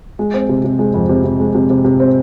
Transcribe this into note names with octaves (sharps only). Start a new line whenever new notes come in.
G#3
C4
C3
C3
G#3
F2
C3
C3
G#3
C3
C3
C3
C4